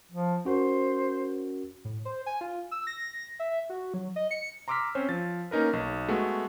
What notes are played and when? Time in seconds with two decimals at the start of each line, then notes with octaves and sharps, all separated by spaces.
0.12 F3
0.45 C#4 F#4 A#4 C5
1.85 A2
2.05 C5
2.26 G#5
2.41 F4
2.71 E6
2.87 A#6
3.39 E5
3.70 F#4
3.94 F#3
4.16 D#5
4.31 C#7
4.68 A#5 C6 D6 E6 F6 B6
4.95 C4 C#4 C5 C#5
5.09 F3 A6
5.51 A#3 C#4 D#4 A#4 B4
5.73 B1
6.08 G#3 A3 B3 F#4